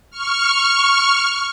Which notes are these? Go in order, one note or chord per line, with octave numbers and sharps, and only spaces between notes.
C#6 F6